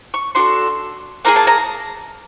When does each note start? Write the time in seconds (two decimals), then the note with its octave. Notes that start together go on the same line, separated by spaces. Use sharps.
0.14 C#6
0.35 D4 F#4 A4 C6
1.25 A#3 D#4 G#4 A#5
1.36 A5
1.47 A#5